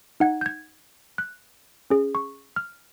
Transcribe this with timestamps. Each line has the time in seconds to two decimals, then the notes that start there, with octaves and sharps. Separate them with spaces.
0.20 D#4 F#5 G#6
0.41 G6 G#6
1.18 F#6
1.90 C#4 G#4
2.15 C#6
2.56 F6